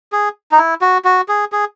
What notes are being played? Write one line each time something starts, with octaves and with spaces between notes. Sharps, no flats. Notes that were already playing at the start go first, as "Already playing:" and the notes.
G#4
D#4
E4
F#4
F#4
G#4
G#4